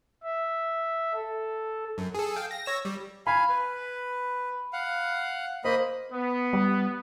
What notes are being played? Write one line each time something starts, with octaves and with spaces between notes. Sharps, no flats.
E5
A4
F#2
G#4 A4
F5 G5
A#6
C#5 E6 A#6
G3
F5 G#5 B5
B4
F5 F#5
A#3 C5 D#5 B5
B3
G3